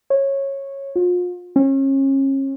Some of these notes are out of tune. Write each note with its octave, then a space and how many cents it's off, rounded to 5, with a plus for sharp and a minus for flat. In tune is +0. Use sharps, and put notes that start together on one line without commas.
C#5 -15
F4 +35
C#4 -35